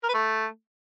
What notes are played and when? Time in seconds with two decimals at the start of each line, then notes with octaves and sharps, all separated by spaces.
0.03 A#4
0.09 B4
0.14 A3